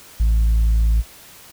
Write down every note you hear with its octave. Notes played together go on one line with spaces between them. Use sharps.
A1